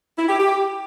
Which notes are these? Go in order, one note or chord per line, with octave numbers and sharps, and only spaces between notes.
E4
G4
G4